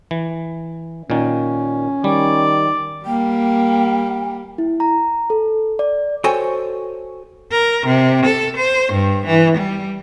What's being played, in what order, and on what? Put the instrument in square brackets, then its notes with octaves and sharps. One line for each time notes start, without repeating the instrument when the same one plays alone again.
[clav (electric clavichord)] E3
[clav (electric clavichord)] A#2 D#3 [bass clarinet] C#4
[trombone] D#3 [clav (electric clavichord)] G3 [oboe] D5
[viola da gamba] G3 A#3 [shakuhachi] G5
[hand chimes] E4
A#5
A4
D5
[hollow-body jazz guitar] F#4 A4 C5 C#5 G5 G#5
[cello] A#4
C3
A4
C5
G2
E3
G3